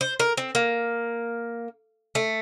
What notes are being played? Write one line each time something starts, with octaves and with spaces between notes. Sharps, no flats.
C5
A#4
C4
A#3
A3